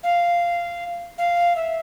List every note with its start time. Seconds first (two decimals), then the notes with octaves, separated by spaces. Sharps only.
0.03 F5
1.18 F5
1.56 E5